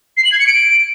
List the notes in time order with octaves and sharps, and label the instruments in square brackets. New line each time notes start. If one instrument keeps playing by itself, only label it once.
[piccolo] C7
F#7
G#6
C#7
D7